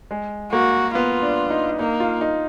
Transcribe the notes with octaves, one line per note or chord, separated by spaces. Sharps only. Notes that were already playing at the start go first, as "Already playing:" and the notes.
G#3
A#3 F#4
B3 F4
D4
D#4
A#3 D#4
F4
D#4